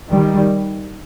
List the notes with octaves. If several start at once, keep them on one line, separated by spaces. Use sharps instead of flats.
D#3 G3